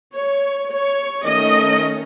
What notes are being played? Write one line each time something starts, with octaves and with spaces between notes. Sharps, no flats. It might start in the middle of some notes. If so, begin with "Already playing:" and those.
C#5
C#5
D#3 A3 C#4 D#5